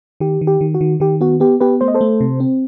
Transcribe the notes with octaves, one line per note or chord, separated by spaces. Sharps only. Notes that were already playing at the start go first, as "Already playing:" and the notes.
D#3 G4
D#3
G4
D#3
F#4
D#3
D#3 G4
B3 F#4
B3 G4
B3 G4 B4
A3 C5
D#5
A4 C5
A3
C3
C4